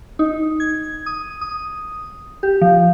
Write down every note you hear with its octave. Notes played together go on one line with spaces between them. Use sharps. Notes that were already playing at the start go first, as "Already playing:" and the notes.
D#4
G#6
D#6
D#6
G4
F3